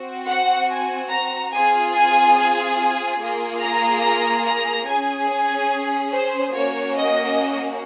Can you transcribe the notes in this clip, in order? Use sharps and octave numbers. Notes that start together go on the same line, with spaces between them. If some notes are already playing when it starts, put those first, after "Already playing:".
Already playing: C4 F#4
F#5
G#5
A#5
C4 F4 G#4 G#5
G#5
G#5
A#3 F4 G#4
A#5
A#5
A#5
C#4 G#4 G#5
G#5
C5
A#3 C#4 F#4 C#5
D#5